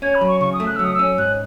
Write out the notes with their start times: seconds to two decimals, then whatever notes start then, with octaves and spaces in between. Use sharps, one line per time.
0.02 C#4 G#6
0.15 B5
0.21 F#3
0.28 C#6
0.41 C#3 C#6
0.53 D#6
0.60 A3
0.66 F#6
0.76 F#3 E6
0.84 D#6
0.94 C#4 E6
1.18 G#2 F#6